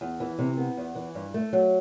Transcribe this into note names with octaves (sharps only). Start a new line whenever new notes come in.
E2
E3
C3
B3
E2
E3
G2
A3
F#3